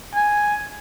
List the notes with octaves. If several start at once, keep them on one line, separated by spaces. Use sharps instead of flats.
G#5